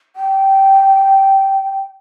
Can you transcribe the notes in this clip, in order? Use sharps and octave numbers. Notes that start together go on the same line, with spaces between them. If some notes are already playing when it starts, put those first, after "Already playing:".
G5